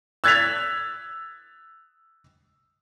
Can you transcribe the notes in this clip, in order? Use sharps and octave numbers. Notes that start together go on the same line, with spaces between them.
E6 F#6 G#6 A6 B6 F7